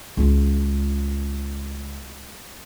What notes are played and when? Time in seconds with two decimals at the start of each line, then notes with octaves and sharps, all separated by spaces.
0.17 C#2 F4